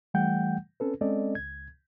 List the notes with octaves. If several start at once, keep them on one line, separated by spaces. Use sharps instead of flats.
E3 G3 A3 F#5 G5 G6
C4 C#4 A4 B4
G#3 C4 C#4 A4 D5 D#5
C#2 G#6